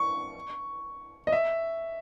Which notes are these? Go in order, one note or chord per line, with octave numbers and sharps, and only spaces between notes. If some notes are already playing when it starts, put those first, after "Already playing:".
Already playing: C#6
D#5
E5